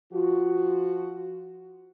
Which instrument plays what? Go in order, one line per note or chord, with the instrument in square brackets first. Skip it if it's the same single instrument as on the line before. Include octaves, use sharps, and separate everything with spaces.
[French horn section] F3 F4 F#4